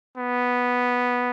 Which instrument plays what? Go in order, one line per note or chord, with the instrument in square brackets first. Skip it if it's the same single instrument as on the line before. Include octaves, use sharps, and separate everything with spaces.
[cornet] B3